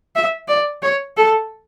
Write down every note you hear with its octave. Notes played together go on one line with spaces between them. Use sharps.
E5
D5
C#5
A4